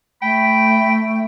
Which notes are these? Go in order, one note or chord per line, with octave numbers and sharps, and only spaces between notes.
A3 G5 B5